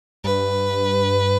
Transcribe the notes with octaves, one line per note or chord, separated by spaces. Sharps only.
G2 B4